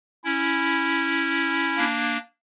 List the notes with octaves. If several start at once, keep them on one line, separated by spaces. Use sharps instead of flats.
C#4 E4
A#3 D4